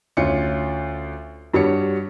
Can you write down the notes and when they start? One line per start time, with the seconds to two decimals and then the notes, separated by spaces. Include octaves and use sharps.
0.17 D2 C#4 F4 C#7
1.54 G2 G3 F#4 C#5 C#7